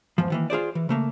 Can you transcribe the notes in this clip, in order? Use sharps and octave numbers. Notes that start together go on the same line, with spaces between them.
E2 G#2 F3
D#3 E3 A#3
F4 G#4 C5 D5
E3
C#3 A3 A#3